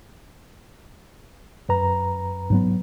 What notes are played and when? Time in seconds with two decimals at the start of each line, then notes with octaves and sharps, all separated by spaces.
1.69 F#2 B4 A#5
2.50 G#2 F#3 B3